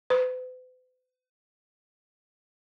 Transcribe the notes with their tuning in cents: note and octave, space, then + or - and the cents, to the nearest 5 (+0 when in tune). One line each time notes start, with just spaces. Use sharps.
B4 +45